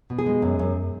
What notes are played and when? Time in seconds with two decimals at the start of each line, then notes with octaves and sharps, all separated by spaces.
0.10 B2
0.19 G#4
0.26 G#3
0.42 F#2
0.59 F#2